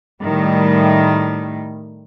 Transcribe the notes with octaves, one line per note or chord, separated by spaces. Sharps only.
A2 D#3 G3